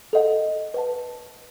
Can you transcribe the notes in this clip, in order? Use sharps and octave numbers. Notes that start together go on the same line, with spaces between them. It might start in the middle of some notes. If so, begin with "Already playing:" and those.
A4 D#5 F#5
B4 F#5 A5